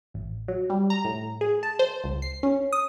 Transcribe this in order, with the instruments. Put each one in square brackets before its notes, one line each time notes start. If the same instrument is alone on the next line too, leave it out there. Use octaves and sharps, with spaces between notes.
[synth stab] A1
F#3
G3
A#5
A2
G#4
A5
C5
C#2
C7
C#4
D#6